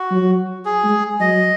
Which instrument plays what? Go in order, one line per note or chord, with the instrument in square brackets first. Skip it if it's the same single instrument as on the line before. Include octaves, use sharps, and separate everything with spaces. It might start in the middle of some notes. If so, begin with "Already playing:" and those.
Already playing: [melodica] F#4
[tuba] F#3
[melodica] G#4
[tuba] G#3
[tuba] F#3 [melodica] D#5